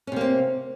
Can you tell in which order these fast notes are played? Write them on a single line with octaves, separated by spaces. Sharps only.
C#4 C3 A#3 C4